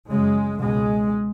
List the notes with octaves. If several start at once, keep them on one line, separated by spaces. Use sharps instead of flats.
F#2 C#3 G#3
C#2 B2 G#3